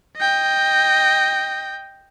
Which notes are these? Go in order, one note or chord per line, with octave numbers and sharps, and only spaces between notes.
D#5 G5